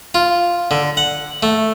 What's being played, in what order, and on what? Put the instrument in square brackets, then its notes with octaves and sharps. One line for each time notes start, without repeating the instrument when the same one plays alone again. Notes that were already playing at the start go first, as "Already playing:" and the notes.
[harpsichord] F4
D3
F#5
A3